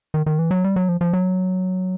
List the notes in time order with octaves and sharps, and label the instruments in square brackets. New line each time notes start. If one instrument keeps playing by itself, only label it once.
[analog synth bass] D#3
D#3
E3
F#3
G3
F#3
F3
F3
F#3